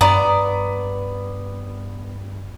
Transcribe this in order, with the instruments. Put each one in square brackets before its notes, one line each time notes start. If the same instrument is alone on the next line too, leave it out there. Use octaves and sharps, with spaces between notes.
[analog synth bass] G2 [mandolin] B3 D5 [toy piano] A#5